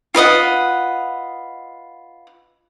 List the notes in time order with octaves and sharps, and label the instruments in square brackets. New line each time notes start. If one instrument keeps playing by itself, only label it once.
[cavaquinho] F4 B4 D#5 F#5